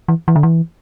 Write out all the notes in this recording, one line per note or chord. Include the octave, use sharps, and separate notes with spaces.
E3
E3
D3
E3